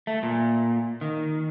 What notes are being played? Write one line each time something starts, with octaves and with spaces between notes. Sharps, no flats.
A3
A#2
D#3